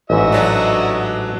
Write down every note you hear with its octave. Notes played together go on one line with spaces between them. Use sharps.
A1 G#2 F#4 D#5 E5
F#3 D4